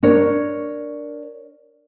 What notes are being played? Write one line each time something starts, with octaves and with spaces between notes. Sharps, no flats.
D4 A#4 C#5